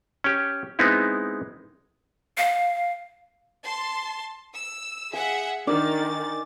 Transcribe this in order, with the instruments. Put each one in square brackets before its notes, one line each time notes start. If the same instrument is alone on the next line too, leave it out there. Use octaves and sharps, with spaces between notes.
[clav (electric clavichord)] C#4 G4
G#3 B3 C4 D#4 E4
[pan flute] F5
[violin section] A5 C6
E6
[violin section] G#4 E5 F#5 [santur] G#5
[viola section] D#3 [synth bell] D4 A#4 [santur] D5 [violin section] A6